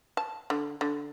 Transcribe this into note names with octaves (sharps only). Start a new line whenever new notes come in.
A5
D3
D3